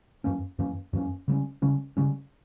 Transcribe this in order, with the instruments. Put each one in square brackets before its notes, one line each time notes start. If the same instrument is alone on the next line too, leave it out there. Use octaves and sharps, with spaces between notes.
[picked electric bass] F#2 E3 A#3 C#4
F#2 E3 A#3 C#4
F#2 E3 A#3 C#4
C#3 G3 C#4
C#3 G3 C#4
C#3 G3 C#4